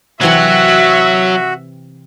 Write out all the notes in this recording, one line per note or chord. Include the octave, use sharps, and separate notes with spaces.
C3 E3 F#3 C4 F#4 E5